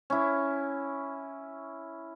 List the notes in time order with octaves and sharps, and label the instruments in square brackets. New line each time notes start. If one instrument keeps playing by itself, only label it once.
[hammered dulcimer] C#4 E4